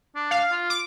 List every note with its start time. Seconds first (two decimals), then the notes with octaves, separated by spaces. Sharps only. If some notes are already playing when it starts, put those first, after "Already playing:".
0.16 D4
0.31 F5
0.52 F4
0.70 D6